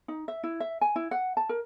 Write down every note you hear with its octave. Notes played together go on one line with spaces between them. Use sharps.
D#4
E5
E4
E5
G#5
E4
F#5
A5
A#4